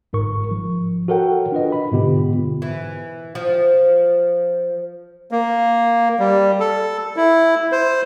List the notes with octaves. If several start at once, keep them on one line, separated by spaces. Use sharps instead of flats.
G1 G#2 A#4 C#6
F3
F#4 A4 A#4 C#5 F#5 G5
D4 F4 B4 D#5
B5
G#2 B2 D3 B3 F4 G4
E3
F3
A#3
G3
A4
E4
C5